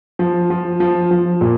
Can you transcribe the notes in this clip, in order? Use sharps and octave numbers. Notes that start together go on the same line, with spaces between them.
F3
F3
F3
F3
A#2